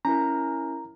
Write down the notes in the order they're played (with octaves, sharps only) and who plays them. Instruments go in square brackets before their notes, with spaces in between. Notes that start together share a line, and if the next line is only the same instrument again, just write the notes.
[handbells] C#4 E4 A#4 [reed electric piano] A#5